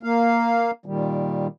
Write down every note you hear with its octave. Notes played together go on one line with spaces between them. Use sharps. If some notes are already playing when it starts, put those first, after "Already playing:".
A#3 F5
A#2 D#3 G3